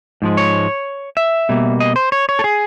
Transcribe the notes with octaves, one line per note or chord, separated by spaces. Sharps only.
G#2 F3 G#3
C#5
E5
B2 G3 A#3
D#5
C5
C#5
C#5
A4
G#4